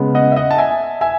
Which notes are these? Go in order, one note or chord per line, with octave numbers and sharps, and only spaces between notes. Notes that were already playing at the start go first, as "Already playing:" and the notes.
Already playing: C#3 G#3 B3
D#5 F#5
E5
D#5 F#5
A5
E5 G#5
E5 G#5